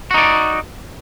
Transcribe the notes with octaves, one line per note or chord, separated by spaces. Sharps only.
D#4 F#4 D5